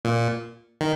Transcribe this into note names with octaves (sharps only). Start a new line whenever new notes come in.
A#2
D#3